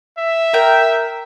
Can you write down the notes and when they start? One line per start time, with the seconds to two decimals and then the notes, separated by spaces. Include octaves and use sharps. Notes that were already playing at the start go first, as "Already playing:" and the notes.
0.18 E5
0.53 A#4 G5